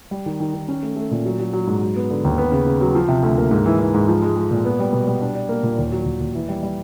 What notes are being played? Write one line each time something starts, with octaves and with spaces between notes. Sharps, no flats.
G3
D#3
D#3
D#3
C#4
A3
A3
A#2
F#3
F#3
F#3
G#2
F#3
B3
D3
D#2
B3
C#3
C#3
F#3
F3
C3
D2
A#3
G#2
E3
E3
G#2
F3
G#3
G#3
A#2
B3
G3
B2
G3
D4
D4
A#3
A#2
D#2
F#3
D#2
D#2
E3
G3
G3